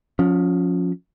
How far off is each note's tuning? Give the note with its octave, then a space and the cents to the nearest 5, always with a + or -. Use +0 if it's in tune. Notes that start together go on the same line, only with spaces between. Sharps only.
F3 +30 C#4 +10